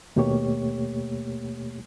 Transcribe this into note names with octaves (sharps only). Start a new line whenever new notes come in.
D#2 B2 A3 A#3 G4 C#5